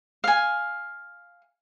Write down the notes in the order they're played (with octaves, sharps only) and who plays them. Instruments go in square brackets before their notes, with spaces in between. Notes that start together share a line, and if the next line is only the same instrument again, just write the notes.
[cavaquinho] F5 G#5